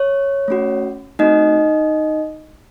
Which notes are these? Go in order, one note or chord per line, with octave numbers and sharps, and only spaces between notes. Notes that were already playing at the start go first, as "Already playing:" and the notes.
Already playing: C#5
A3 C#4 F#4
A3 C4 D#4 F#4 D#5